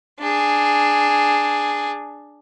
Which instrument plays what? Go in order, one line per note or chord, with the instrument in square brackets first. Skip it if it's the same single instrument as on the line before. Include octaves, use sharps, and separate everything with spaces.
[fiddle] D4 G#4